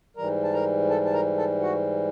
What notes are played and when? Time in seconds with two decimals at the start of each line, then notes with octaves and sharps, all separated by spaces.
0.16 G#2 E3 G3 A#4 A#5
0.44 A5
0.54 A#4 A#5
0.90 A4 A5
1.05 A5
1.13 A#4 A#5
1.37 A4 A5
1.62 F#4 F#5